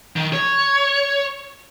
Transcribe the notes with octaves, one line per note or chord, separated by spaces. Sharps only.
D#3
C#5